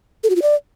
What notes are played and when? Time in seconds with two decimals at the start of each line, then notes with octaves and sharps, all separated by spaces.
0.24 A4
0.30 F#4
0.36 F4
0.42 D5